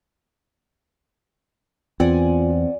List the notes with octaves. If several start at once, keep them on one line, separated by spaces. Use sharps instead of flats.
E2 C4 F4 D5 F#5 G#5